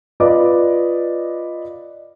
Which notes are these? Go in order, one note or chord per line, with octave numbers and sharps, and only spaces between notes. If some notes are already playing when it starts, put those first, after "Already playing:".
F4 B4 D5 D#5 D6